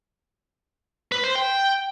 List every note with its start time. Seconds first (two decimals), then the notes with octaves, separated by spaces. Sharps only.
1.12 B4
1.24 C5
1.35 G5